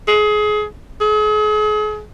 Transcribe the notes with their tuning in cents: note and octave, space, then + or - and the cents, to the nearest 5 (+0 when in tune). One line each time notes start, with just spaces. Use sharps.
G#4 +25
G#4 +40